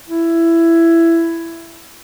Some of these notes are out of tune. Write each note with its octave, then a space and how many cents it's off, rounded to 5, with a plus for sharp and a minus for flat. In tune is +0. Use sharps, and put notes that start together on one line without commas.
E4 +15